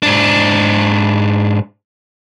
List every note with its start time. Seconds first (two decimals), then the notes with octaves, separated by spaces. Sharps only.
0.03 G#2 D4